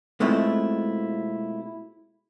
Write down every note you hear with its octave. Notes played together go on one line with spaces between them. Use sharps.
B2 G#3 A3 C4 E4 F4